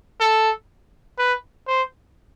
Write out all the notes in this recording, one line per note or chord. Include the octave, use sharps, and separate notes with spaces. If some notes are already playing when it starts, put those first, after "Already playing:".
A4
B4
C5